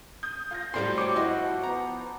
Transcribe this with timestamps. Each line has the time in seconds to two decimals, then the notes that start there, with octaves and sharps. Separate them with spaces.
0.23 D#6 G6
0.51 F4 G6 A#6
0.74 A2 F#3 G3 G4 C5 D5 C6
0.98 C#5 G5 D6
1.16 F3 E4 F#4 D#5
1.63 B3 A#5